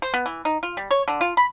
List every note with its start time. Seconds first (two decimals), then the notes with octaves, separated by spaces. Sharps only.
0.02 C5
0.14 B3
0.26 E3
0.45 D#4
0.63 F4
0.77 G3
0.91 C#5
1.08 D3
1.21 F4
1.37 B5